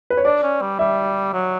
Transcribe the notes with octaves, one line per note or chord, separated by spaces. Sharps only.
B4
C#5
D4 D5
C#4
G3
G3 E5
F#3